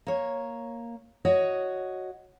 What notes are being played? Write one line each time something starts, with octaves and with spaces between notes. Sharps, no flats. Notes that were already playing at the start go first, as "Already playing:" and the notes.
A#3 C#5
F#4 C#5 D#5